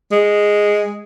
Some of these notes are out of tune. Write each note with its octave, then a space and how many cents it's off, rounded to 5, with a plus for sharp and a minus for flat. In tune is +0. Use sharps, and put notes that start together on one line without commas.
G#3 -5